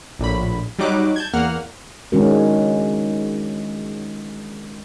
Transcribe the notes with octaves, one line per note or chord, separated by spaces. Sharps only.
A#1 A2 B5
F#3 G3 D#4 D6 F#6
A5 G6 G#6
E2 A#3 F#5 F6
D#3 G#3 C#4 D4 F#4 A#4